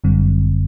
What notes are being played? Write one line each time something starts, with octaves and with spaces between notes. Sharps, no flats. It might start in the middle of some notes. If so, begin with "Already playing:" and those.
G1 F#2 D3 G3 C4